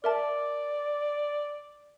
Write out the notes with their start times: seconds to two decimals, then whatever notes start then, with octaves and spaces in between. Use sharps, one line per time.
0.04 A#4 D5 E5 A5